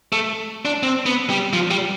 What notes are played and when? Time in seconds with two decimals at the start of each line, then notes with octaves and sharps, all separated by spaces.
0.12 A3
0.65 D4
0.83 C4
1.06 B3
1.30 G3
1.53 F3
1.71 G3